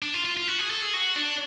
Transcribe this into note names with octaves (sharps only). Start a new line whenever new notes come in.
D4
F4
F4
F4
F#4
G#4
A4
G#4
F#4
D4